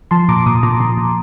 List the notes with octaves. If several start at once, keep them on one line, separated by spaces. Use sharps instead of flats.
F3 A5 C6
A#2 A#5 D6
A#2 C6 D#6
A#2 A#5 D6
A#2 A5 C6
A#2